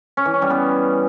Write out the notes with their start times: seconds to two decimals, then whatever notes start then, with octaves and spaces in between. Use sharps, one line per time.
0.17 C#4
0.25 E3
0.34 C#4
0.42 G3
0.50 B3